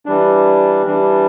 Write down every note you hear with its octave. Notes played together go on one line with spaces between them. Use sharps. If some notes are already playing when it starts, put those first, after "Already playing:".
E3 G3 D4
E3 G3 D4